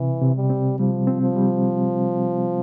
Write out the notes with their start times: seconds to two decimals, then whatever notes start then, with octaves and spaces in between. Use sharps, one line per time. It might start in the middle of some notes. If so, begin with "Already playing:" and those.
Already playing: C3 E3
0.21 C3
0.36 G3
0.50 C4
0.79 F3 G3
1.07 C4
1.22 F3
1.36 G3